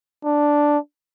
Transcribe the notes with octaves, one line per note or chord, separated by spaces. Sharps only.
D4